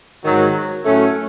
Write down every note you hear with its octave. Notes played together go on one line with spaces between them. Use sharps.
G#2 D#3 F#3
A2 F#3 A3 C#4